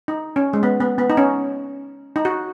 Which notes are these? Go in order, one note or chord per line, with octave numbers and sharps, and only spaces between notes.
D#4
C#4
G#3
B3
B3
B3
D#4
C#4
D#4
F#4